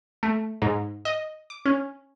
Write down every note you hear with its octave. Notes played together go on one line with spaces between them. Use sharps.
A3
G#2
D#5
D6
C#4